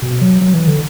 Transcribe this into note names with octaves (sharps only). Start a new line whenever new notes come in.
B2
F#3
F#3
E3
D3